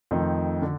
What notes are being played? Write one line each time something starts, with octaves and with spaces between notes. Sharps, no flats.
F2 D#3 A3 C4 D#4
D3